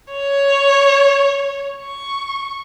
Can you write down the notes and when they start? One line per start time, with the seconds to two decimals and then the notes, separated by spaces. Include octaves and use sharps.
0.12 C#5
1.83 C#6